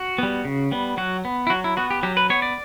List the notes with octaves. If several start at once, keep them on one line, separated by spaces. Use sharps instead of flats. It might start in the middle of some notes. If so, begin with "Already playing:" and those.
Already playing: F#4
G3 B3
C#3
G3 B3
F#3 F#4
B3
E4
F#3 F#4
E4
B3 F#4
G4
F#3 G4
B4
B3 C#5
D5